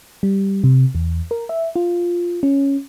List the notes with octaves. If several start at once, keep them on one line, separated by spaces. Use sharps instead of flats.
G3
C3
E2
A#4
E5
F4
C#4